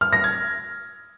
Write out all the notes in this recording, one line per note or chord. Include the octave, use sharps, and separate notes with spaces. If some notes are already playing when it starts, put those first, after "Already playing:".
F6
A#6
G#6